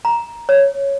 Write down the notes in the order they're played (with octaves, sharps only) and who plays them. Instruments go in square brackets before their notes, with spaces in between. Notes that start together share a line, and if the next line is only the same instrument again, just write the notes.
[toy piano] A#5
C#5